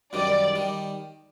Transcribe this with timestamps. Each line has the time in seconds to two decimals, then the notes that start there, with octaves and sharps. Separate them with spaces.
0.13 F#2 D#3 G3 D5
0.56 D#3 G3